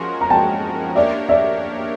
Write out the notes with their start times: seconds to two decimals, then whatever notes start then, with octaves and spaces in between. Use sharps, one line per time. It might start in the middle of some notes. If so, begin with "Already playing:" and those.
Already playing: F3 G#3 C#4 F#4 A#4 C6
0.21 A#5
0.30 G5 A5
0.95 A#3 D4 G4 A#4 C#5 D5 E5
1.29 D5 E5